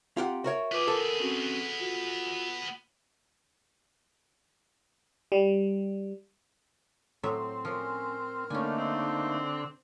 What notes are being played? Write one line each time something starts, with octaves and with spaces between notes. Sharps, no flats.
C4 F4 G4 F#5 A#5
F#4 A#4 C#5 E5
B3 F4 G#4 B4 D6
A4 A#4
C4 C#4 F#4
F4 F#4
G3
A2 F#3 C4 E5
F3 C#4 A#4
D3 A3 A#3 C#4 D#4 G#5
C4